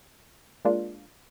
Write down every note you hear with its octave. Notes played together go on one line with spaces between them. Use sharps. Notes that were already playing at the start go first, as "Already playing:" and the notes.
G#3 A#3 D4 F4